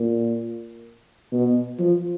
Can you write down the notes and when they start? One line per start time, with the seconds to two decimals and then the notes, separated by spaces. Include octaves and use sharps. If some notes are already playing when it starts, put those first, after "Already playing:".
Already playing: A#2
1.32 B2
1.79 F3